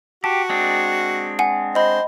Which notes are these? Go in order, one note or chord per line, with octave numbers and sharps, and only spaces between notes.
F#4 G4 A5
G#3 C4 D4
F#5 G#5
C5 D#5 B5